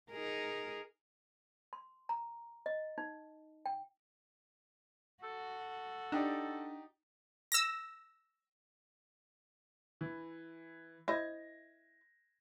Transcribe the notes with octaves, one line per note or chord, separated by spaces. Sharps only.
D#4 G#4 A#4
C6
A#5
D#5
D#4
G5
F#4 A4
D4 D#4 G4 D5
E6 A#6
E3
E4 C5 D#5 G#6 A#6